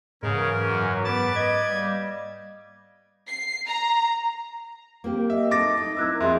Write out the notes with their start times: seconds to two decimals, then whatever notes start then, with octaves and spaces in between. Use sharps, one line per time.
0.23 G#2 C#3 E3 F#3 C#4 A#4
0.66 F#2
1.05 B3 B4 A5 B5 D6 A6
1.36 D#5 G#6
1.68 G3 A#3 G4
3.28 C7
3.66 A#5
5.04 A#3 C4 G4
5.30 D#5 E5
5.51 D#4 A4 D6 A6 A#6
5.77 D#4
5.97 C4 E4 A#4 E6 F#6 G#6
6.20 F2 C4 G#4 E5 C6